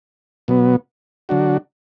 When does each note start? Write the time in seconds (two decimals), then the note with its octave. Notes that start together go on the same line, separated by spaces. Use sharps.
0.48 B2 F#3 B3
1.29 D3 F#3 D4 F#4